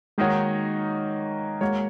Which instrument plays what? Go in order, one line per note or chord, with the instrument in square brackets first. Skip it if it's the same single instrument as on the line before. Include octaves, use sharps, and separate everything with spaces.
[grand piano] D#3 A#3 D#4 F#4 C#5 [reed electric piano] G#3
[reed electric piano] G#3 [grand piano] A#3 F#4 C#5